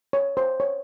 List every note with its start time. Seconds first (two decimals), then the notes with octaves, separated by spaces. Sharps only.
0.13 C#5
0.37 C5
0.60 C#5